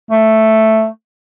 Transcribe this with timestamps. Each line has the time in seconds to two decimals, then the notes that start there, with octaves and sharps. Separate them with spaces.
0.10 A3